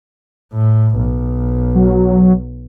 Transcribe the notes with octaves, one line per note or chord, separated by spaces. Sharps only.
A2
B1
F#3